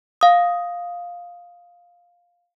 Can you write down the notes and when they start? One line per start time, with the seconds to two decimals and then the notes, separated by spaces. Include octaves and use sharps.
0.21 F5 D#6